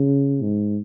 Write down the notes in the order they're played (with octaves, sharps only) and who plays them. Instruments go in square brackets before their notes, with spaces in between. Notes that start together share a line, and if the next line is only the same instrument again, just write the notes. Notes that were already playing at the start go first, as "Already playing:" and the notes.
Already playing: [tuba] C#3
G#2